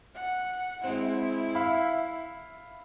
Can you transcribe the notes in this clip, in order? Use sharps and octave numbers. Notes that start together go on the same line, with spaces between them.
F#5
G#3 C4 E4
E5 F5 B5